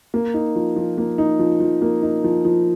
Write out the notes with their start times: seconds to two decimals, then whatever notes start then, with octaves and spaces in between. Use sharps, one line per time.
0.14 A#3
0.34 D#4
0.56 F3
0.76 F3
0.98 A#3
1.18 D#4
1.39 F3
1.60 F3
1.82 A#3
2.03 D#4
2.24 F3
2.45 F3